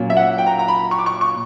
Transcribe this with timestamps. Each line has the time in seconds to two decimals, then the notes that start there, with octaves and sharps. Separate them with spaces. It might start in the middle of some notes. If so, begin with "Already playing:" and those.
Already playing: A#2 F#3 A#3 C#4
0.10 E5
0.17 F#5
0.38 G5
0.46 A#5
0.59 A#5
0.68 B5
0.91 C#6
0.99 D6
1.06 C#6
1.21 C#6